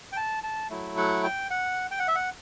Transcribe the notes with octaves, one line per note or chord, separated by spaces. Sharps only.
G5
A5
A5
F#3 A3 E4
F#5
G5
F#5
G5
F#5
E5
F#5